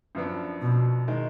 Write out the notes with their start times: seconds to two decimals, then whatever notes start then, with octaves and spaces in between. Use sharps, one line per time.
0.15 F#2 F3 B3 D4
0.61 B2
1.08 D#3 G#3